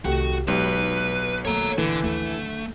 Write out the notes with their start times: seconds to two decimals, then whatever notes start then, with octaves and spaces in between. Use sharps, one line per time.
0.05 C2 D#3 A3 F#4 G4
0.48 B1 G#3 D#4 G4 B4 C#5
1.45 D#3 A3 A#3 C#5 A#5
1.78 A#1 D3 E3
2.04 D#2 D3 F#3 A3